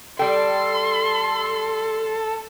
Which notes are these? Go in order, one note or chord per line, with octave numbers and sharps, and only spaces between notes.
G3 A4 G5 C6